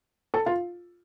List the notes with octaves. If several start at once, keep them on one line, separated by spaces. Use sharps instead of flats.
A4
F4